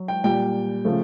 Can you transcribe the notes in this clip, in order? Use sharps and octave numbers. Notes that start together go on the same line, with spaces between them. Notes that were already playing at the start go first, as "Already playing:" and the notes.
Already playing: F#3
G5
A#2 G3 G5
C#3 F3 A3